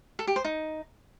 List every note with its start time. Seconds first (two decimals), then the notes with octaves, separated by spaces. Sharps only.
0.19 A4
0.27 G4
0.36 C5
0.45 D#4